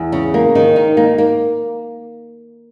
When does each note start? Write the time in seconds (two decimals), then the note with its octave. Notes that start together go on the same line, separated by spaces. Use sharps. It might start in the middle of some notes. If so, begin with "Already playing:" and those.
Already playing: E2
0.12 C#3
0.34 A#3
0.55 D#3
0.76 D#4
0.97 A#3
1.18 A#3